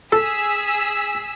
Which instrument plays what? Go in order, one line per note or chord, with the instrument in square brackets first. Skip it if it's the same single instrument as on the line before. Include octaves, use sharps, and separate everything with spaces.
[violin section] G#4 E6 B6 [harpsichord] A4